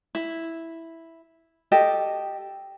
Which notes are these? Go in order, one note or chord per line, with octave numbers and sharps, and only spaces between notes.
E4
G4 A4 D#5